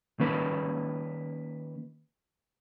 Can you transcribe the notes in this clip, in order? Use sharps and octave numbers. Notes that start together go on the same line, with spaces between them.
D#3 A#3 C#4 B4